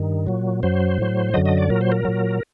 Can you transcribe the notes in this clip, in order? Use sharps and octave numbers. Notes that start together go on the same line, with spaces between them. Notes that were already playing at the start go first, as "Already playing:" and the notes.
Already playing: G2 D#3
A#2 F#3
F#2 F#3 C5
A2 F#3
F#2 D3 F#3 D#5
D#5
D5
A#2 F#3 A#4
C5
A#4
A#2 F#3